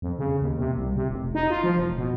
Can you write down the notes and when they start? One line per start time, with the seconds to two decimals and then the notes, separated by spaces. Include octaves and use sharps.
0.02 F2
0.18 C#3
0.42 D#2
0.59 C3
0.77 C2
0.96 C3
1.11 F1
1.35 D#4
1.50 F4
1.64 F3
1.79 F1
1.98 B2